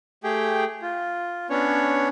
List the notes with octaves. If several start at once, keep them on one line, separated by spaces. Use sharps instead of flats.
A3 G4 G#4 G5
F4
B3 C#4 D4 C#5